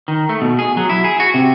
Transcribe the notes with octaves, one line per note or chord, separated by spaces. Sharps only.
D#3
A3
B2
G#4
F#3
E4
G#4
F#4
C3